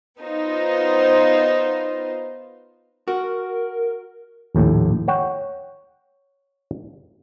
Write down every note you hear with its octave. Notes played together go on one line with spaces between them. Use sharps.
B3 D#4 F4 C5
F#4 A#4
A#1 D#2 A2
C#5 F#5 G5